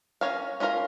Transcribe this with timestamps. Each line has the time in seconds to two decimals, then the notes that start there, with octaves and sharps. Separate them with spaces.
0.21 C#4 F4 A#4 C#5 F5
0.60 C#4 F4 A#4 C#5 F5